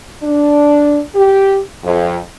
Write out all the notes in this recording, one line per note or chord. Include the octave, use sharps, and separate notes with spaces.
D4
G4
F2